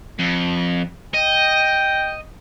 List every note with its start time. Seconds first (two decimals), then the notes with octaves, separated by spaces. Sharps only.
0.19 F2
1.14 D#5 G5